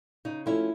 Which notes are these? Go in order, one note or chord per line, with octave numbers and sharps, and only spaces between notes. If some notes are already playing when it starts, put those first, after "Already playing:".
C#3 D#4
F3 A3 C#4 E4